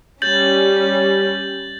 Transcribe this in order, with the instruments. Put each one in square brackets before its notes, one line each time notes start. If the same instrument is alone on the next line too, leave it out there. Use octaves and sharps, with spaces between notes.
[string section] G3 C#4 [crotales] G6 A6 F#7